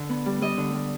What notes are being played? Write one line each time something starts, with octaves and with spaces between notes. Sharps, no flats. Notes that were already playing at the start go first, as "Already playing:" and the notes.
Already playing: D3
B3
G3
G3 D#5
D3
G3